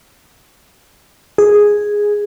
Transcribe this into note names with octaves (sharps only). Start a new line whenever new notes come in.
G#4